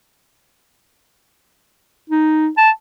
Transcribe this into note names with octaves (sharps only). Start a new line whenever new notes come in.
D#4
A5